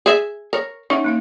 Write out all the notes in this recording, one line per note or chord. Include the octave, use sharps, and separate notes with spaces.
G#4 E5
A#4 C#5
C#4 D#4 E5 F#5
A#3 D#4 F5